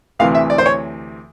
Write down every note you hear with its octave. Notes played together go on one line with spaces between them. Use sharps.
D2 C3 E3 F5
E5
D5
C5
C#5